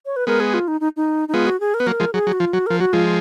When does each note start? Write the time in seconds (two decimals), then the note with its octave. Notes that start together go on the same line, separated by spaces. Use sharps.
0.06 C#5
0.16 B4
0.27 G#3 B3 A#4
0.40 G#4
0.54 F4
0.68 D#4
0.81 D#4
0.97 D#4
1.28 D#4
1.34 G#3 B3 F4
1.47 F#4
1.60 G#4
1.74 A#4
1.80 B3 B4
1.86 F#3 A#3 A#4
2.00 F3 G#3
2.13 F#3 G#4
2.27 F#3
2.33 F#4
2.40 F3 F4
2.53 F#3 F#4
2.67 F3 A#4
2.80 F#3 F#4
2.93 F3 G#3 F4